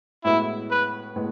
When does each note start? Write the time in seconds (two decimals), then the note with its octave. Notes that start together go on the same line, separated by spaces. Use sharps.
0.24 A2 G#3 B3 E4 F#4
0.71 B4
1.16 A2 G#3 B3